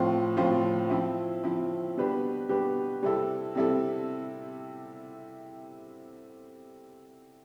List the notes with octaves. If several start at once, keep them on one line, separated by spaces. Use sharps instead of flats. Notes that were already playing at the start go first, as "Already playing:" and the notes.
Already playing: A2 F3 C4 F4 C5
A2 F3 C4 F4 C5
F3 C4 E4
F3 C4 E4
B2 G3 D4 G4 B4
B2 G3 D4 G4 B4
C3 G3 C4 E4 A4
C3 G3 C4 E4 A4